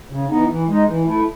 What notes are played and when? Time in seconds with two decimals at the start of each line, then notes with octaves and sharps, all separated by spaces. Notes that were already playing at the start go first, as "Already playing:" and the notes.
0.10 C#3
0.29 E3 B3 D#4
0.49 E3
0.67 G#3 D#4
0.87 E3
1.06 A3 E4